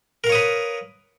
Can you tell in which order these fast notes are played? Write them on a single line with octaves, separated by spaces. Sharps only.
A#4 F5 C#5 D#6 B4